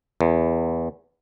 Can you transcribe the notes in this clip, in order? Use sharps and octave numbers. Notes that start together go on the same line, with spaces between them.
E2